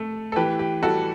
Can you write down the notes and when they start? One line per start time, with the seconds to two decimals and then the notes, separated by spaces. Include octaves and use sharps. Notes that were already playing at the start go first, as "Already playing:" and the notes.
Already playing: A3 A4
0.32 A4
0.36 E3 G4 B4
0.59 G4
0.82 G3 F#4 A4